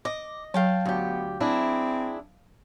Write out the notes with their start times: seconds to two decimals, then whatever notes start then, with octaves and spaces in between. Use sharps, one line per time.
0.05 D#5 D6
0.54 F#3 F5 G5 A5
0.85 D2 B3 G4
1.40 C4 D4 E4 G#4